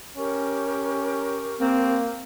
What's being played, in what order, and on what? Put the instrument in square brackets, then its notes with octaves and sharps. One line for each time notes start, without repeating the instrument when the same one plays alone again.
[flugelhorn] C#4 [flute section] G4 A#4 C#6
[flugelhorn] A#3 [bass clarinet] C4